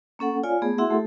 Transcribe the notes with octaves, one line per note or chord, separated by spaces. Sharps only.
A#3 C#4 A4 F#5
F4 C#5 D5 F5 G#5
A3 B3 G#4
E4 F#4 G#4 E5 F#5 C6
A3 G4 A4